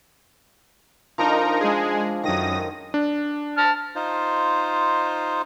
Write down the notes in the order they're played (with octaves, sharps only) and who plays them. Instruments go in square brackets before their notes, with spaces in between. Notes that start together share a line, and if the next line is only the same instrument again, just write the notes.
[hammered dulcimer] F3 D4 [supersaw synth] D#4 A#4 A#5
[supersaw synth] G#3 G#4
[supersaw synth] F#2 D#6 A#6 [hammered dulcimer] D#3
[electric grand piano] D4
[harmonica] A5 F6
[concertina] D#4 F4 C5